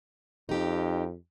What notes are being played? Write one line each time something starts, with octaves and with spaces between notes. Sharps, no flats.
F2 D#4 G4